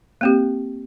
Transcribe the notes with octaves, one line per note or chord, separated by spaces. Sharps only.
A#3 C4 G4